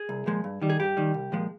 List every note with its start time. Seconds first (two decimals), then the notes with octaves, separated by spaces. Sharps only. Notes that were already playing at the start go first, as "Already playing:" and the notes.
Already playing: G#4
0.09 C2
0.26 A#2 F3 G#3
0.44 G2
0.62 D#3 G3
0.70 G#4
0.79 G2 G4
0.97 D#3 G3
1.14 C2
1.32 A#2 F3 G#3